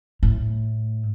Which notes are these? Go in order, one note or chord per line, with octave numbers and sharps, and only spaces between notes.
A2